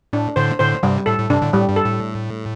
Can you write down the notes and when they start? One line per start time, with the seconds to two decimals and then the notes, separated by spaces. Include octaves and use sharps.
0.13 A2 D4
0.36 A2 D3 C5
0.59 A2 D3 C5
0.83 G2 C3 G3
1.06 A2 A4
1.18 A2
1.30 G2 C3 D4
1.42 A2 D3
1.53 A2 G3
1.69 G2
1.76 A4
1.85 A2